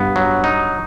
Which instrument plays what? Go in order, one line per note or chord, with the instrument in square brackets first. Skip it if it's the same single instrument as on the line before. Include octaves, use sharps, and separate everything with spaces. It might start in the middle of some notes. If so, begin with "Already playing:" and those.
Already playing: [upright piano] G2 [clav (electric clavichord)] B3
[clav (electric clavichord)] F#3
D#4